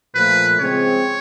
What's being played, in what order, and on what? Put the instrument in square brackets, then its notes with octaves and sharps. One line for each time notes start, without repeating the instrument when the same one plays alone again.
[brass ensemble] A#2 F3 A3 [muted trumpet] B4
[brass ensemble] C#3 F3 G#3 C4 [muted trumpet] C#5